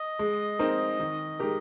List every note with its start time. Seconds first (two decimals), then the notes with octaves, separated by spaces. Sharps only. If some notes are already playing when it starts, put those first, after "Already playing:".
Already playing: D#5
0.19 G#3
0.59 C4 D#4 A#4
0.99 D#3
1.39 G#3 D#4 G4 A#4